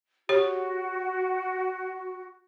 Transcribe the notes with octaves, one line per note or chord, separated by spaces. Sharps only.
F#4 G4 C#5